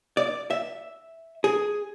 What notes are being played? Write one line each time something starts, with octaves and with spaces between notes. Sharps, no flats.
D5
E5
G#4